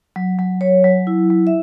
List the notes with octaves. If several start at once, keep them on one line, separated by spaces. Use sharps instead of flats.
F#3
F#3
F#3 C#5
F#3
E4
F#3
E5